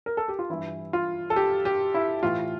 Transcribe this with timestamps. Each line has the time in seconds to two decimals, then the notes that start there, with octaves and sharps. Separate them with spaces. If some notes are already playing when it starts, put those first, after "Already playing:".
0.06 A#4
0.17 A4
0.28 G4
0.39 F4
0.50 G2 E3 E4
0.93 F4
1.30 A4
1.36 G4
1.65 G4
1.94 E4
2.23 A2 E3 F4